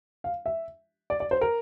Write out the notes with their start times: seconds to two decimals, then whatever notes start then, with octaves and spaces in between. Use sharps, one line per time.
0.24 F5
0.46 E5
1.10 D5
1.20 D5
1.31 C5
1.41 A#4